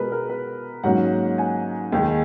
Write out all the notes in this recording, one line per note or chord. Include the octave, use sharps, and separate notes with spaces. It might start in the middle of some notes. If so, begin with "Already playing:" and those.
Already playing: B2 G#3 B3 A#4 B4
A#4
B4
G#2 F#3 A#3 C#4 F#5
G#5
D#2 D#3 G#3